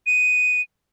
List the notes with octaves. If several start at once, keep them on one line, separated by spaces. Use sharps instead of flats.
D#7